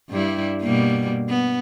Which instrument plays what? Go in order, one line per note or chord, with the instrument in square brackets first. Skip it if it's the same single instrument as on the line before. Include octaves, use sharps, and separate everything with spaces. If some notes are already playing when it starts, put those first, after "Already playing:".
[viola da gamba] G2 G3 E4
B2 G3 A#3
B3